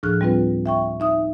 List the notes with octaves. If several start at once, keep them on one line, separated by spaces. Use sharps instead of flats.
D2 A2 F3 G#4 F6 F#6
G3 C4 F4 B4
E5 G5 C#6
D#4 E5 D#6